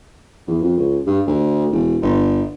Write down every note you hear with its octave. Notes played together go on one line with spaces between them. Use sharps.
E2
F2
C#2
G2
D2
E1
G1